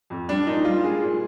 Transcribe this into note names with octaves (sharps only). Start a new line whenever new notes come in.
F2
G3 D4
A#2 D#4
G3 F4
G#3 G#4
A#2